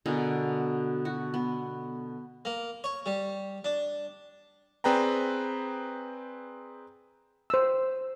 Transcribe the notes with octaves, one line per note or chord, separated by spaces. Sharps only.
B2 D3 G#4 A#4
F#4
B3
A#3
C#5
G3
D4
C4 G#4 B4 D5 G5 A#5
C5 E6